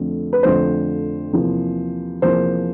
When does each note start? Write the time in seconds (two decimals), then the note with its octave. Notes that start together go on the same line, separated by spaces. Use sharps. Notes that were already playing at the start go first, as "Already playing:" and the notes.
Already playing: F2 D3 F3 A3 C4
0.33 B4
0.43 F2 D3 F3 A3 C4 C5
1.33 E2 C3 F3 A#3
2.22 E2 C3 F3 A#3 C5